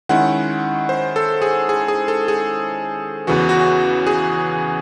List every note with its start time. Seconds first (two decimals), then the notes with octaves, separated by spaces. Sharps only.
0.09 D#3 G#3 C#4 E4 F#5
0.89 C5
1.16 A4
1.42 G#4
1.69 G#4
1.88 G#4
2.08 A4
2.28 G#4
3.27 E2 C#3 E3 F#4
3.49 F#4
4.07 G#4